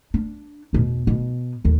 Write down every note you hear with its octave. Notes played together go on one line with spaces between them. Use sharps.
D4
E2 B2
B2
D#2 D3